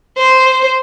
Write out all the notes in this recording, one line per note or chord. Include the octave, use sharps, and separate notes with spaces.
C5